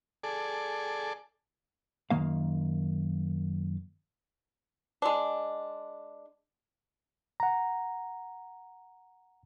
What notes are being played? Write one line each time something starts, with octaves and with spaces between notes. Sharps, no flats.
G#4 A4 D5
F#2 D#3 A#3 F5
G#3 D4
F#5 A#5